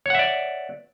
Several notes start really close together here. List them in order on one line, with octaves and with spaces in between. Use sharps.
C#5 F#5 E5 D5